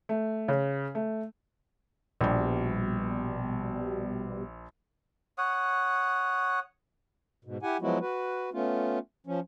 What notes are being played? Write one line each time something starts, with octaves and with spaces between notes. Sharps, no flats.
A3
C#3
A3
A#1 B2 G3
C#5 F#5 D#6
G#2 B2
E4 G4 F#5 G#5
F3 F#3 G#3 B3 E4 F#4
F#4 B4
A3 B3 C#4 F4
F3 C#4